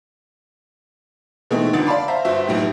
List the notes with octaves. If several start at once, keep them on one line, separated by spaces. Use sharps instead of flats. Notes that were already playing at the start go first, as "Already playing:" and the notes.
B2 E3 G#3 A3 C4 D#4
F1 D2 D3 F#5 A6 D7
D5 F5 A5 B5 C6 D6
C5 E5 F5 A#5
G1 F#4 C5 E5
F1 B1 A2 G4